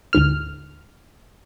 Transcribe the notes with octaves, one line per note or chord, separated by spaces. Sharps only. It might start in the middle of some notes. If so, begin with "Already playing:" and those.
D2 G#2 F6